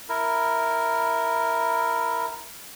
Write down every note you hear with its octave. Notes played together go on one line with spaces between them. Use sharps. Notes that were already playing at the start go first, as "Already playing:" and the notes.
E4 A#4